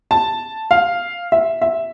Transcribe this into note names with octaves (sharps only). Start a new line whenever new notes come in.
A5
F5
E5
E5